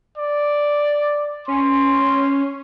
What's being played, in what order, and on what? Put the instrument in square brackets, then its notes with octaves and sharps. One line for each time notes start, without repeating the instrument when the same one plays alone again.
[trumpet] D5
[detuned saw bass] C#4 [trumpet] C6